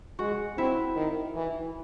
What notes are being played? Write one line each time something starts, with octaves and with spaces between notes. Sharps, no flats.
G#3 F#4
C4 E4
D#3
E3